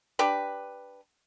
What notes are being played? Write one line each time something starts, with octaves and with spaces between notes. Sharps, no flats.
D4 G4 B4